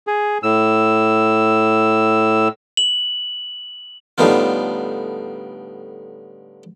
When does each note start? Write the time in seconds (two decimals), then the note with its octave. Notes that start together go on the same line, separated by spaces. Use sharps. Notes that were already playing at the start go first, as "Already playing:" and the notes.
0.07 G#4
0.43 A2 E6
2.77 F#7
4.18 A2 D3 G3 B3 D#4 F4